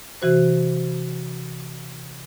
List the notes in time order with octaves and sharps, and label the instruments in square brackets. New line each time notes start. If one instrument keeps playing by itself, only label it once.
[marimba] C3 E3 F#4 C5